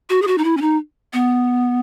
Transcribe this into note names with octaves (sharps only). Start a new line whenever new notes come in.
F#4
G#4
F#4
D#4
E4
C#4
D#4
B3